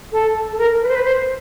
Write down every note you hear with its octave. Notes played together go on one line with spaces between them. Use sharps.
A4
A4
A#4
B4
C5
B4
C5